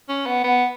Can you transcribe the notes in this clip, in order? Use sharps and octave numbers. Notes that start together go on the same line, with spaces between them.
C#4
B3
B3